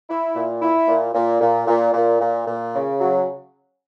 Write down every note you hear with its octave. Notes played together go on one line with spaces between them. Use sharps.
E4
A#2
E4
A#2
A#2
A#2
A#2
A#2
A#2
A#2
C#3
F#3